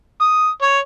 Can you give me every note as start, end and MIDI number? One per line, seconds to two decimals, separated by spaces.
0.21 0.48 87
0.62 0.78 73